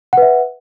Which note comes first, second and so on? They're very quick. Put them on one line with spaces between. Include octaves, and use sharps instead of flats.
F#5 B4 E5